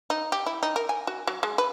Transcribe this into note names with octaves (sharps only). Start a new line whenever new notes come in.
D#4
G4
E4
D#4
A#4
G#5
F#4
F#3
G#3
B4